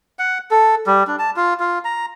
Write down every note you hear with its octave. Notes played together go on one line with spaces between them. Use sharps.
F#5
A4
G3
D4
A5
F4
F4
A#5